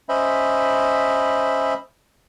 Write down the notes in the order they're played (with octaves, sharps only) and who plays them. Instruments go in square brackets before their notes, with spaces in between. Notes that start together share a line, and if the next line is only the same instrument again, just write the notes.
[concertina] C#4 C5 D#5 E5 B5